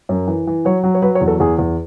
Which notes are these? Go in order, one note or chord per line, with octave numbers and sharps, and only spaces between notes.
F#2
E3
E3
F#3 C#5
F#3
C#5
F#3 B4
C#5
E2
A4
E2 G#4
E2